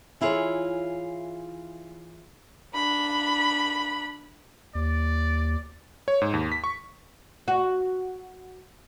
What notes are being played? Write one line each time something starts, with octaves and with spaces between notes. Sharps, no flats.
E3 E4 F4 G#4 A#4 C#5
D4 B5
D#2 D5
C#5
G#2
D#2
B6
C#6
F#4